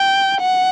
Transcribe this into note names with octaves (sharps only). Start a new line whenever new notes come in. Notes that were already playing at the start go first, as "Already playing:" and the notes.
Already playing: G5
F#5